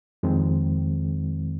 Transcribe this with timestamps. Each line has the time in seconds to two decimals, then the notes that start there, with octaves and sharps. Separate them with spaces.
0.23 F2 D#3 G#3 C4